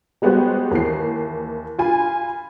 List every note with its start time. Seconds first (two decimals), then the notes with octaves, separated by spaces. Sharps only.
0.22 G3 G#3 B3 F#4 G4 C5
0.71 D#2 E3 C7
1.78 F4 G#5 B5